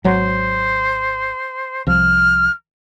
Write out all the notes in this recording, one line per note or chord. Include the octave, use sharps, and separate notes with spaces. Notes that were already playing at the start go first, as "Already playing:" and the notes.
G#1 F#3 C5
C2 F3 F6